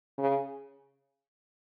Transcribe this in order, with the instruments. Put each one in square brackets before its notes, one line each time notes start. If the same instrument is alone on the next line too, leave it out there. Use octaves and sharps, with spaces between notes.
[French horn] C#3